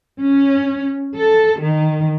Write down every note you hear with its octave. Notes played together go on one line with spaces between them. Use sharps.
C#4
A4
D#3